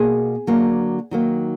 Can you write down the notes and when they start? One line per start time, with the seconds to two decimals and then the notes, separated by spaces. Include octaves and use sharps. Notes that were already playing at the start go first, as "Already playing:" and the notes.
Already playing: B2 A#3 G#4
0.47 D3 F#3 A#3
1.11 D#3 F#3 A#3